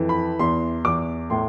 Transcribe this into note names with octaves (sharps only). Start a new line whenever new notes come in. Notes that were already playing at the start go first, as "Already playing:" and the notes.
Already playing: F2 E3
B5
E2 C6
E2 D6
A2 C6